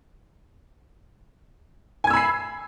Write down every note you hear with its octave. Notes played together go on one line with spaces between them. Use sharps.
G#5 B5 E6 G#6 C7